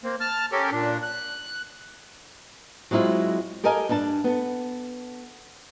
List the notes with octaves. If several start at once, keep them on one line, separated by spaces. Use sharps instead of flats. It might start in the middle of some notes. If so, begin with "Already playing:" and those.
A#3 C4
A5 F6
C#4 G4 A4 A#4
A#2 D4
F#6
F#3 G#3 C4 E4 F4
G4 A4 A#4 D#5 F5 G#5
G2 G3 D4 A5
B3 A4